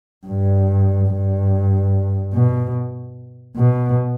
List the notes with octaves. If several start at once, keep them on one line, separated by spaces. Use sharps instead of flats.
G2
G2
B2
B2